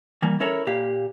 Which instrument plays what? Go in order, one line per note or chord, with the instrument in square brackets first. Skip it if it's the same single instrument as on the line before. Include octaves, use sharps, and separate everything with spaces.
[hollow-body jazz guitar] E3 G3 A#3
C#4 E4 A4 A#4 C#5
A#2 A#3 G4 F5